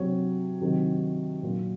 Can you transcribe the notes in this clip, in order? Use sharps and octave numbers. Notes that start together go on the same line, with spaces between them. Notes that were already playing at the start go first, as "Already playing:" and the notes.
Already playing: C3 F#3 C#5
C3 D#3 F#3
A#2 F#3